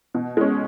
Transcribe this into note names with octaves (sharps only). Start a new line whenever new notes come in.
B2
G#3 C#4